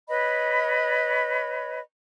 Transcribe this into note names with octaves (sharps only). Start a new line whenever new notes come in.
B4 C#5 D#5 B5